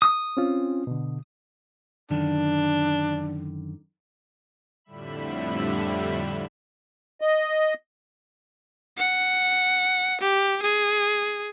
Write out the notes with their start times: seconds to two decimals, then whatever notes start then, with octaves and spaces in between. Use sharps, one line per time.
0.02 D#6
0.37 C4 C#4 F4
0.87 B2 D3
2.11 F#2 D3 D#3 D4
4.85 F2 A2 D3 G3 E5 B5
7.21 D#5
8.98 F#5
10.21 G4
10.62 G#4